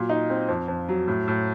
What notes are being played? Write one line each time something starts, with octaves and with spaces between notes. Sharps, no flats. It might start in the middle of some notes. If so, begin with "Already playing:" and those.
Already playing: A#2 F#3
D#4
C4
F2
F2
F#3
A2
A2